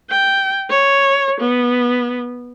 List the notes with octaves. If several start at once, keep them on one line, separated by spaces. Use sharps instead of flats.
G5
C#5
B3